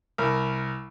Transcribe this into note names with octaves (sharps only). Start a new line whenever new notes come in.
C2 A#4